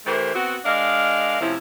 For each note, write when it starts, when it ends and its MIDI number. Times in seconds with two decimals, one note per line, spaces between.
0.06 0.34 52
0.06 0.34 57
0.06 0.34 67
0.06 0.34 70
0.06 0.34 72
0.35 0.58 59
0.35 0.58 60
0.35 0.58 66
0.65 1.38 56
0.65 1.38 62
0.65 1.38 70
0.65 1.38 75
0.65 1.38 77
1.41 1.55 48
1.41 1.55 53
1.41 1.55 57
1.41 1.55 61
1.41 1.55 64